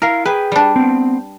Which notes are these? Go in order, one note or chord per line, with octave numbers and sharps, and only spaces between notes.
E4 A#4 F5
G#4 B4 G5
G3 D4
B3 C4